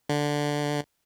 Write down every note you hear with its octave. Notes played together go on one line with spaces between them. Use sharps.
D3